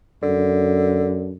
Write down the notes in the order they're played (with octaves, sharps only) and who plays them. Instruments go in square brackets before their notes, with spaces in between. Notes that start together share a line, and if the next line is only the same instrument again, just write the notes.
[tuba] F#2 [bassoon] D3